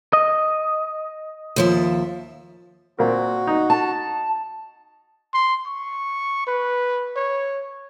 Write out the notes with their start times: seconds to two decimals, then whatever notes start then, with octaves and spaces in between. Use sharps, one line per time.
0.13 D#5
1.56 D#2 F3 E5
2.99 A#2 C4 F#4 A#4
3.47 D#4
3.70 A5
5.34 C6
5.67 C#6
6.47 B4
7.17 C#5